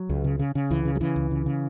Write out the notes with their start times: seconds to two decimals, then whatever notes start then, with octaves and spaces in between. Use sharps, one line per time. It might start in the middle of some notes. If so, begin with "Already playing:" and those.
Already playing: F#3
0.09 C#2
0.24 C#3
0.39 C#3
0.55 C#3
0.70 C#2 E3
0.85 C#3
0.95 F#3
1.01 C#3 E3
1.16 C#2
1.31 C#3
1.46 C#3